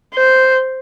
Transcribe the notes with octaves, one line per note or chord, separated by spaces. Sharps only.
C5